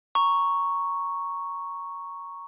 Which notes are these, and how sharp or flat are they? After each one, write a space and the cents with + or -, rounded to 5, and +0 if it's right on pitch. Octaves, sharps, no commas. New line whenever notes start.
A#5 +0 C#6 +0